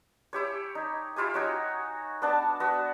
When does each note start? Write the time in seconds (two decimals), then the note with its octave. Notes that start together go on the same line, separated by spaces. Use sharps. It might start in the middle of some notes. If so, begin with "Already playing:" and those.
0.33 E4 G4 C#5
0.75 D#4
1.16 E4 F4 G4 G#5
1.34 D#4 F#4 C#5
2.22 B3 D4 A5
2.60 B3 F#4